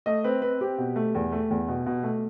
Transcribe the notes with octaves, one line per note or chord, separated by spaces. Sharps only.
A3 D#5
C4 B4
C4 B4
C4 G4
B2
A3
E2
A3
E2
B2
B2
A3